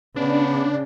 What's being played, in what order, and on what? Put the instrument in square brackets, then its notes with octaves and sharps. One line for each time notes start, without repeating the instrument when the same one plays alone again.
[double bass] C#3 [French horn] B3 [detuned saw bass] D4